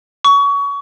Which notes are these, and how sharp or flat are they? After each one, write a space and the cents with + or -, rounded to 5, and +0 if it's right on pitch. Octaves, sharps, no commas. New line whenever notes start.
C#6 +25